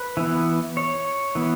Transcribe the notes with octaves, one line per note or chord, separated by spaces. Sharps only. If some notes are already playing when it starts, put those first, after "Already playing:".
Already playing: B4
E3 B3
C#5
E3 B3